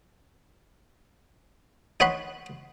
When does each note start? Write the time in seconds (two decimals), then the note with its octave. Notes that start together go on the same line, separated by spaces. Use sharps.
2.00 D#4 C#5 F#5 B5 C6